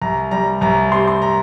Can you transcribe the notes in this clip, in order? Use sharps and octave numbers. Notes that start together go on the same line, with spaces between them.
C2 A#5
G3 A#5
C2 A#5
C3 C6
C6
A#5